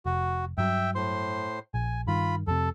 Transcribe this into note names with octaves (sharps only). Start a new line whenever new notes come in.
F1 F#4
G2 F#3 E5 G5
A2 C5 C6
A#1 G#5
G2 D#3 F4 B5
F2 C3 A4